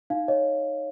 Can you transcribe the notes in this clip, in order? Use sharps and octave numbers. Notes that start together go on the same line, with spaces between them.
D#4 F5
C#5 D#5